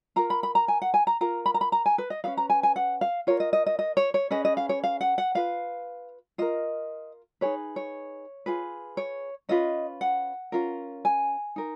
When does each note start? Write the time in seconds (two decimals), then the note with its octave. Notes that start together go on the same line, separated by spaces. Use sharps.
0.16 F4 A#4 A#5
0.30 B5
0.43 B5
0.55 A#5
0.68 G#5
0.82 F#5
0.94 G#5
1.07 A#5
1.21 F4 A#4 A#5
1.46 B5
1.54 A#5
1.61 B5
1.72 A#5
1.86 G#5
1.98 B4
2.10 D#5
2.24 C#4 G#4 B4 F5
2.37 A#5
2.50 G#5
2.63 G#5
2.76 F#5
3.01 F5
3.27 F4 A#4 C#5
3.40 D#5
3.53 D#5
3.66 D#5
3.79 D#5
3.97 C#5
4.14 C#5
4.31 C#4 G#4 B4 D#5
4.45 D#5
4.57 F5
4.69 C#5
4.84 F5
5.01 F#5
5.18 F#5
5.35 F4 B4 F5
6.38 F4 A#4 D#5
7.41 D#4 G#4 B4 C#5
7.76 C#5
8.46 F4 G#4 B4
8.97 C#5
9.49 C#4 F4 B4 D#5
10.01 F#5
10.52 C#4 F4 A#4
11.05 G#5
11.56 D#4 A#4